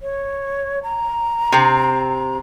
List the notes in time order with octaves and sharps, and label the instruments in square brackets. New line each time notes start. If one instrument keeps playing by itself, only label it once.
[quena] C#5
A#5
[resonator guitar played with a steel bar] C3 C4